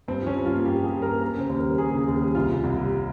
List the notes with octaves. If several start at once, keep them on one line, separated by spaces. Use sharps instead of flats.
G2 C4
F3 C#4
G2
F4
A#3
G2 G4
F3 G#4
G2
A#4
A#3
A#3 A#4
C#3 C5
D#2
A#4
G3
A#3 G#4
C#3 G#4
D#2
G#4
G3
C2 F4
C3
C2
G3